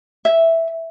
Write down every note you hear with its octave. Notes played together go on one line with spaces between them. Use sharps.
E5